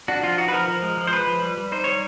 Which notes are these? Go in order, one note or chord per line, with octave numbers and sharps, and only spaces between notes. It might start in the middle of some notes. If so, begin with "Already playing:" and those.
D4 F#4
F3 F4
D#4 F#4
B4
F3 A#4
F3
G#3
F3
C5
G#3 B4
F3
G3
G3
D#4 C5
G3 C#5